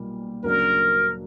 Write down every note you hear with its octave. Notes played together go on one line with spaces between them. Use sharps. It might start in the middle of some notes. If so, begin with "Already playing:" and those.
Already playing: B1 A#2 G3 A#3
D2 C#3 F#3 A#3 D4 A#4